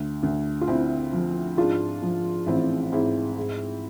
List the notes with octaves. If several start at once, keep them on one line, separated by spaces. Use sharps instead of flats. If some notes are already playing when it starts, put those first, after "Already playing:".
Already playing: D2
D2
F4
D3 C4 E4
F3
G#2 D4 F4
F3
A1 C4 E4
G#2 C4 E4
G#2